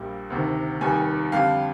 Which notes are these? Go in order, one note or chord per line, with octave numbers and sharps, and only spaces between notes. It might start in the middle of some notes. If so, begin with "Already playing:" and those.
Already playing: A#1 A#2 G3
D2 C3 D#3
F1 D#2 D#3 G3 G#5
F2 D3 G3 F5